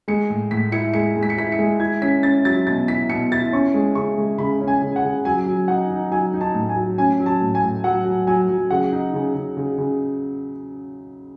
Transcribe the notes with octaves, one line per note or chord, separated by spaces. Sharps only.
G#3 C#7
A2
A2 B6
E4 C#7
G#3 C#7
G#3
B6
C#7
E4 B6
C#7
G#3
E4 G#6
C#4 B6
C#4 A6
F#3 A6
B2 A6
E4 B6
B2 C#7
E4 A6
C#4 C#6
G#3
C#3 C#6
G#3
C#3 B5
C#4
G#5
C#3
F#5
C#3
F#3 G#5
F#3
D#4 F#5
D#4
F#3 G#5
D#4
A5
A2
G#5
F#3
C#4 G#5
F#3
A5
A2
G#5
A2
F#3 F#5
F#3
F#3 G#5
F#3
C#3 F#5
D#4
C#3
C#3
C#3
C#3